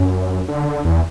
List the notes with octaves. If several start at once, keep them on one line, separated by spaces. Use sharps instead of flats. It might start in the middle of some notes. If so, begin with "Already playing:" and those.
Already playing: F#2
D3
E2